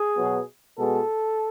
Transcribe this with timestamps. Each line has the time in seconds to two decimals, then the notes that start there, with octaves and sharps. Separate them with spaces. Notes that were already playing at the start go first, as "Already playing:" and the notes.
Already playing: G#4
0.17 B2 F#3 B3
0.78 B2 G#3 B3 A4